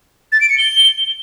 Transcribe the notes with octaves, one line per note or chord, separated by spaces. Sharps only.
A6
D7
C#7
G7